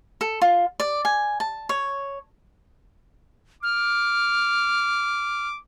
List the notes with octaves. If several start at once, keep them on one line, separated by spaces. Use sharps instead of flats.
A4
F4
D5
G#5
A5
C#5
D6 F6